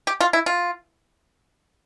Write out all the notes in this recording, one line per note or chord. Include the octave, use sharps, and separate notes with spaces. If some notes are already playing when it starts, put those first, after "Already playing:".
G4
F4
E4
F4